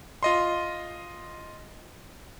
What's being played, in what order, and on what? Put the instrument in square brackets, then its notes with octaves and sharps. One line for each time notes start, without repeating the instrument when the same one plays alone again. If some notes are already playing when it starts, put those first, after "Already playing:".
[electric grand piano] F4 D#5 C6